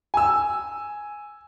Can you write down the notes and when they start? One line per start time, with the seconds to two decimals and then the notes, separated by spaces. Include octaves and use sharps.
0.14 G#5 E6